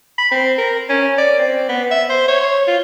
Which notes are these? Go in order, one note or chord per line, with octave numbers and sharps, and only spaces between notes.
B5
C4
A#4
C#4
D5
C4
B3
E5
C5
C#5
F4